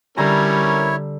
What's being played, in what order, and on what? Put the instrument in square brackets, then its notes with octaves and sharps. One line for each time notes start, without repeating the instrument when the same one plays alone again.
[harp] D3 A#5 [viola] G3 [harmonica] C#4 A#4 [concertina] E4 C#5